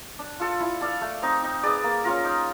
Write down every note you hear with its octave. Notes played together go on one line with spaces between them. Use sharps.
D4
F4 A4
E4
A4 D5 F5
A3
C4 D#4
D#4
G#4 B4 D5
A#3
C#4 F4 A#4
D#4